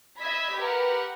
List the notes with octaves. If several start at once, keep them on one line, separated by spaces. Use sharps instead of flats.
D#5 E5 B5 E6 G#6 B6
G4 A#4 B4 F#5